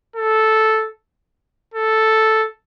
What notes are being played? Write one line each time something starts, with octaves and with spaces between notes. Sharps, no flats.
A4
A4